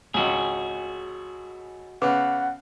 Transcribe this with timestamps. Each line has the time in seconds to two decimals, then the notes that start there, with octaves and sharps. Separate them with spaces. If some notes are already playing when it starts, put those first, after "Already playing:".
0.14 G#1 C#2 F#4 G#4
2.02 C#3 B3 B4 F#5 D6